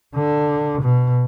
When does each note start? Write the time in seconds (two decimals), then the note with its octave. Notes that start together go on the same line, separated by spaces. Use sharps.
0.15 D3
0.82 B2